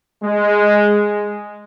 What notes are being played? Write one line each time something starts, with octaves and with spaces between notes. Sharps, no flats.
G#3